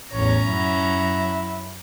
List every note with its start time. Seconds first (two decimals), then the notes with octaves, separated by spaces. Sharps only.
0.12 A1 E2 C#4 C#5 A#5
0.45 F#2 F#3 E4